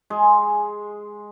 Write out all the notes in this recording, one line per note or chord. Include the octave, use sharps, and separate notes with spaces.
G#3 G#4